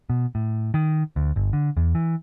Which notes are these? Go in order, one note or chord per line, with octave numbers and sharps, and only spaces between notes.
B2
A2
D#3
D2
G1
D3
E2
E3